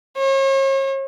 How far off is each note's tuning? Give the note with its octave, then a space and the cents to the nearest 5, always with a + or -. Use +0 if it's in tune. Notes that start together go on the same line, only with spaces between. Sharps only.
C#5 -40